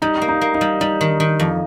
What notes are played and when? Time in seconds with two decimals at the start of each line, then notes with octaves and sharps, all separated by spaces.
0.02 G3 D#4
0.22 A#3
0.29 D#4
0.41 A#3
0.55 D#4
0.61 G3
0.81 G3 D#4
1.01 D#3
1.20 D#3
1.40 F2